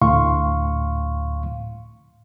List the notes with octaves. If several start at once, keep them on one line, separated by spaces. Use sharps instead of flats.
D2 A2 F5 C6 C#6